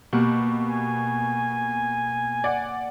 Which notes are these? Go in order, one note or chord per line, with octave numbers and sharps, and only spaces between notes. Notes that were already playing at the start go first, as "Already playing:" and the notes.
B2 A#3 G4 F#5
G#5
D5 F#5